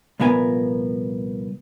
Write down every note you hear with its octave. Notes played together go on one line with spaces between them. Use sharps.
C2 A#2 F3 B3 A#4 G#5